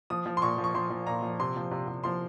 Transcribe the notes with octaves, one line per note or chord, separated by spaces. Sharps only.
F3 D#6
F3
C6
A#2 C#6
F3
C#6
F3 C6
F3
A#2 A#5
F3
C3 C6
F3
C3
C3
F3 C6